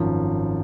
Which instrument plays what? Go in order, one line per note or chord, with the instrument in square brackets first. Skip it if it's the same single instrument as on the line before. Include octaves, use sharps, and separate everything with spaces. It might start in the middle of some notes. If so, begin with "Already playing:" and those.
Already playing: [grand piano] G#1 F#2 F3